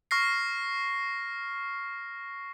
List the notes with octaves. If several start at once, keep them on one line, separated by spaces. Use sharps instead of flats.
C#6 F6 A#6 C7